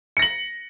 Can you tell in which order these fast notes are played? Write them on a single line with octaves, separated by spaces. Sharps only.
C#7 A#6 F#7